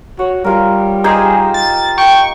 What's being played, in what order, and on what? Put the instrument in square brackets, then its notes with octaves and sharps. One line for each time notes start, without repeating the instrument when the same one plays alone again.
[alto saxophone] F#4 [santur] C#5
[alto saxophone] G3 [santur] F4 A#4
[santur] D#4 G4 C5 [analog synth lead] G#4
[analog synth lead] A6
[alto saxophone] G5 [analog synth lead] C#6